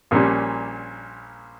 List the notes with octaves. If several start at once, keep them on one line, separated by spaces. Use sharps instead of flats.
A#1 A#2 G3 C#4